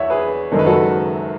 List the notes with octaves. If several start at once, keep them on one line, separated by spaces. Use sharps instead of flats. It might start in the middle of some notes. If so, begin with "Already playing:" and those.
Already playing: E2 C#5 E5 F#5
G#4 B4
F#1 F#2 D#3 G#3 A4
B4
F#4 A4